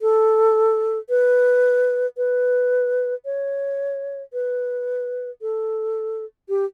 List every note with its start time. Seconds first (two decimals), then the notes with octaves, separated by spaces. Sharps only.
0.02 A4
1.09 B4
2.17 B4
3.25 C#5
4.33 B4
5.42 A4
6.49 G4